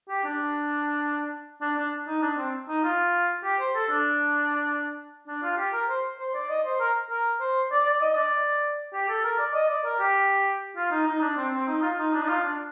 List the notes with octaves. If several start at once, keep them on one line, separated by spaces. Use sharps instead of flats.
G4
D4
D4
D4
D#4
D4
C4
D#4
F4
G4
C5
A4
D4
D4
F4
G4
A#4
C5
C5
D5
D#5
C5
A#4
A#4
C5
D5
D5
D#5
D5
G4
A4
A#4
D5
D#5
D5
A#4
G4
F4
D#4
D#4
D4
C4
C4
D#4
F4
D#4
D4
D#4
F4
D4